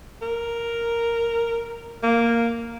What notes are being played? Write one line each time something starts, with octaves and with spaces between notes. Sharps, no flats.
A#4
A#3